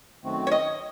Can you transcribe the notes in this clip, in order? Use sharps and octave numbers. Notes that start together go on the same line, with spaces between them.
F#2 D#3 A3 C4 F#4
C#5
D#5